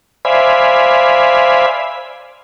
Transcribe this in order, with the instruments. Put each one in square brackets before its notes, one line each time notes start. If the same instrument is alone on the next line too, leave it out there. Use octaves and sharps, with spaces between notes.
[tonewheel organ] C5 D5 E5 F5 G#5 B5